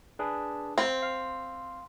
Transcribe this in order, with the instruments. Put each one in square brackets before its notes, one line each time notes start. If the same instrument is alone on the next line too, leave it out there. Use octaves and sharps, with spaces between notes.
[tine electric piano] D4 G#4 B4
[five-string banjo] C4 [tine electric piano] F5
[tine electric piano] F5